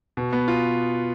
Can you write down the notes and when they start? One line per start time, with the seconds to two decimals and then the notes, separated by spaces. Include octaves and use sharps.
0.17 B2
0.33 B3
0.48 F4